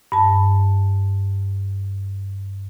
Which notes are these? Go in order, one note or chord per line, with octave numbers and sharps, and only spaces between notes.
G2 A5